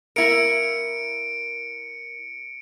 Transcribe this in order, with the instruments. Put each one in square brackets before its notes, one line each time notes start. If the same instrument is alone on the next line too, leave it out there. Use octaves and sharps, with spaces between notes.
[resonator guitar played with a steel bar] A#3 E4 A#4 [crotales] C#7 D7